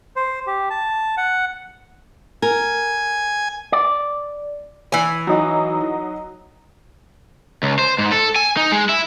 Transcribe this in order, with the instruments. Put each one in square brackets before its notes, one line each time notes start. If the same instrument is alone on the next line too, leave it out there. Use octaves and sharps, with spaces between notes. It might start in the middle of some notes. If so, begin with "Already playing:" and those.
[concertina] C5
G4
A5
F#5
[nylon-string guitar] A#4 [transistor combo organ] G#5
[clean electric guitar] D5
[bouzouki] E3 G#5
[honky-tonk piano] F#3 D#4 F#4
[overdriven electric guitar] C#2
C5
G#2
A4
G#5
D#4
G#3
E4